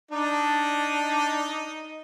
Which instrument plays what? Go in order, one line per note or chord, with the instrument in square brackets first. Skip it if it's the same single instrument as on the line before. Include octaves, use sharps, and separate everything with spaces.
[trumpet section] D4 [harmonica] D#4 D#5